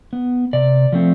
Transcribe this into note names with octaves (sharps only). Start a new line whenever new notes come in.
B3
C3 D5
F3 A3 C4